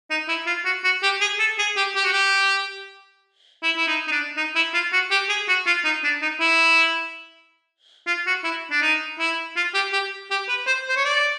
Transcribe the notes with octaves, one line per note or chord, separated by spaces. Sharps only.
D#4
E4
F4
F#4
F#4
G4
G#4
A4
G#4
G4
G4
F#4
G4
E4
E4
D#4
D#4
D4
D#4
E4
F4
F#4
G4
G#4
F#4
F4
D#4
D4
D#4
E4
F4
F#4
E4
D4
D#4
E4
F4
G4
G4
G4
B4
C5
C5
C#5
D5